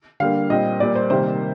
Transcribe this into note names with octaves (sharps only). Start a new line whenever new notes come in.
D3 G3 A#3 F5
A#2 G3 C4 D#5
A#2 G3 A#3 D5
C5
C3 D#3 G3 A#3 C5